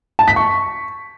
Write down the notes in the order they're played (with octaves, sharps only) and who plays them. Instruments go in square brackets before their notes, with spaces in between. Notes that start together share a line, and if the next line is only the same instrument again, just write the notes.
[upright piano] A5
B6
C#6